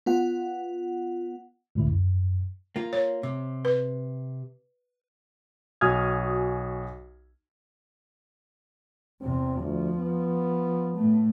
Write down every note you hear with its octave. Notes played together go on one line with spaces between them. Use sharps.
B3 F4 F#5
C#2 A2 D3 E4
F#2
A#3 F4
C#5
C3
B4
B1 F#4 G#5 D#6 F6 G#6
E2 C3 C4
D2 F3
B3
A2 A3